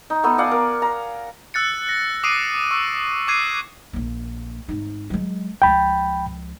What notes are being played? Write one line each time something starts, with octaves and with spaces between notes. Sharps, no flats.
D#4
A3 B3 D#4
D5 F5 F#5 G#5
A#4
A#5
E6 F#6 A6 C#7
A#6
D6 D#6 C7 D7 D#7
C#6 E6
D6 F#6 G#6 C7 D#7
A#1 A#3
G#1 D#4
F#3 G#3
C#2 F3 G5 B5